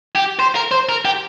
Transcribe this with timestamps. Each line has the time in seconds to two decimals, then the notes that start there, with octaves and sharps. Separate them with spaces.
0.16 G4
0.40 C5
0.56 A#4
0.72 C5
0.89 A#4
1.05 G4